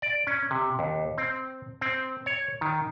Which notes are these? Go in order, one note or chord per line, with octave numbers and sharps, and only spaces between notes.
D5
C#4
C3
D#2
C4
C4
C#5
D#3